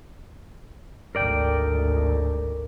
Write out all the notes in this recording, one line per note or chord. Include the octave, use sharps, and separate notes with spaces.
G#1 D2 A#4 D5 G5